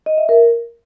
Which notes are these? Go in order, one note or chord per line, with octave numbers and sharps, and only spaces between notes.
D#5
E5
A#4